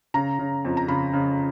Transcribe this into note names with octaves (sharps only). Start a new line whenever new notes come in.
C#3 A#5
C#3
F2
A#5
C#3 B5
C#3